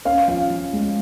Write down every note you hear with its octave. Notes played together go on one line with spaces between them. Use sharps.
C#4 F5
F3 F5
F3
G#3